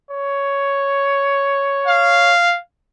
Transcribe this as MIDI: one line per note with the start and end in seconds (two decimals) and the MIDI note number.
0.11 2.34 73
1.87 2.58 77